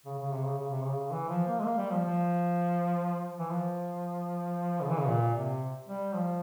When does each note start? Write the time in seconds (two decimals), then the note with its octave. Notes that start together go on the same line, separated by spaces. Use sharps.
0.06 C#3
0.19 C#3
0.33 C3
0.45 C#3
0.58 C#3
0.71 C3
0.83 C#3
1.12 E3
1.29 F3
1.47 A#3
1.60 G#3
1.65 A#3
1.78 G3
1.91 F3
2.05 F3
3.39 E3
3.50 F3
4.82 C#3
4.91 E3
5.00 C#3
5.08 A#2
5.35 C3
5.89 G3
6.15 F3